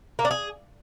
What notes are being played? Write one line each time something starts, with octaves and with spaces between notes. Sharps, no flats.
A#3
D4
G#4